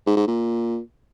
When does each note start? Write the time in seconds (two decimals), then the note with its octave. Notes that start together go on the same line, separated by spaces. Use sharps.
0.06 G#2
0.17 G#2
0.27 A#2